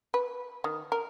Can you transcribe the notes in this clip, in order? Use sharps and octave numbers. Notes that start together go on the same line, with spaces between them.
B4
D#3
A#4